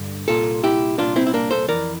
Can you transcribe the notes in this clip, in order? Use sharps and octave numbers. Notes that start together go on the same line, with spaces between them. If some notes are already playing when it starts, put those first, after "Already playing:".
Already playing: G2 D3
C2 A#2 F4 A4
E4 G4
C2 A#2 D4 F4
C4 E4
E4
A#3 D4
A4 C5
F2 E3 A#4 D5